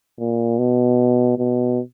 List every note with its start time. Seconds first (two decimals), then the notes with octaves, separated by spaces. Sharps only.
0.19 A#2
0.59 B2
1.38 B2